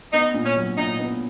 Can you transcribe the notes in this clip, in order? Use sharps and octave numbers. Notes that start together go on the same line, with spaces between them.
B3 D#4
A#2
C#4
F#3
A#2 D#4
B3